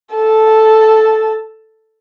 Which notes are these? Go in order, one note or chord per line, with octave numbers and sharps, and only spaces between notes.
A4 A5